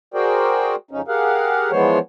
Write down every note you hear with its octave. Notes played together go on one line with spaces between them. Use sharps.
F#4 G#4 A#4 C5 D5 G5
F2 C#3 C#4 D#4
G4 G#4 A#4 F5 F#5
E3 F3 G#3 B3 C5 C#5